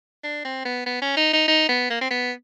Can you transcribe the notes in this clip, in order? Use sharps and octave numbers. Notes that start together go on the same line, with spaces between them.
D4
C4
B3
B3
C#4
D#4
D#4
D#4
B3
A#3
C4
B3